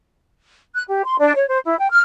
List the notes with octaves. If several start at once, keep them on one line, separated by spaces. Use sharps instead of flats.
F#6
G4
C6
D4
C#5
C5
E4
G5
F6